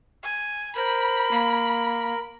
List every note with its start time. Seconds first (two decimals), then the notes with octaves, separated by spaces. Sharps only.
0.24 G#5
0.76 A#4 C5 B5
1.31 A#3